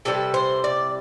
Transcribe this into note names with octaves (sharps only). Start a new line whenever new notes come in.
C3 E3 G3 A4
C5
D5